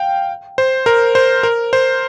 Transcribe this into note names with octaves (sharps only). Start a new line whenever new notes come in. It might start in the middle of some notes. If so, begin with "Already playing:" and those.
Already playing: F5 G5
C5
A#4
C5
A#4
C5